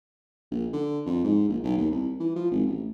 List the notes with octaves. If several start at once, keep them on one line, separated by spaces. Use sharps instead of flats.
A#1
D3
F2
G#2
A#1
B1
D#2
C2
E3
F3
G#1
A1